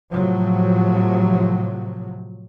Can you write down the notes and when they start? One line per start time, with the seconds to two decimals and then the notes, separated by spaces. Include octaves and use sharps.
0.12 A2 C3 F3 F#3